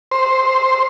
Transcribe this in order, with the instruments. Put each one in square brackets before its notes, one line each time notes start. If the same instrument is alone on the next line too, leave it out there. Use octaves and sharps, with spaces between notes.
[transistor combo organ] C5